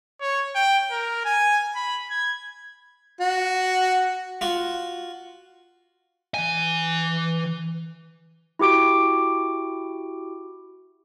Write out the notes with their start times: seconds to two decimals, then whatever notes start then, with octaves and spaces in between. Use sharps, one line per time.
0.21 C#5
0.55 G5
0.91 A#4
1.25 G#5
1.76 B5
2.10 G#6
3.21 F#4
4.41 F4 F#4
6.34 E3 G#5
8.59 E4 F#4 G4 D6 D7